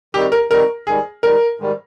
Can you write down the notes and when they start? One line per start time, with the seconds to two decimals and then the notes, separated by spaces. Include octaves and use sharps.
0.14 D#3 G3 C4 D#4 F#4 G4
0.32 A#4
0.50 D#3 G3 C4 D#4 F#4 A#4
0.87 G#2 D#3 G3 G#4
1.23 G#2 D#3 G3 A#4
1.59 G#2 D#3 G3